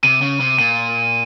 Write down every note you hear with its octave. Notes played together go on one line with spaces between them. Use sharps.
C3 D#7
C#3
C3
A#2 D#7